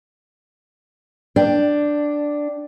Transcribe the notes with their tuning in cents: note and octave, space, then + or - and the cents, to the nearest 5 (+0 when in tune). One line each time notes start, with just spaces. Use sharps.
D4 +0 G5 +0